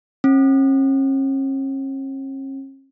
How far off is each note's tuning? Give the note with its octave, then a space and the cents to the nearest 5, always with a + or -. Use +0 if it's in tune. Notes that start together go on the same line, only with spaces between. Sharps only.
C#4 -45